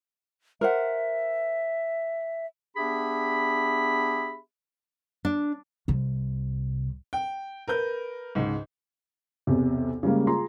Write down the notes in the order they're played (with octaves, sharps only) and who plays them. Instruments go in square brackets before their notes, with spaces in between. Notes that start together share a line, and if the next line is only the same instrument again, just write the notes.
[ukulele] A#4 C5 F#5 [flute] E5
[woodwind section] B3 D4 G4 G#4 E5 B5
[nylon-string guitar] D4
[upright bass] C2 C3
[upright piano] G5
A#4 B4 G6
C#2 G#2
B1 E2 C3
C#3 G3 G#3 A#3
F4 G#4 A#5 C6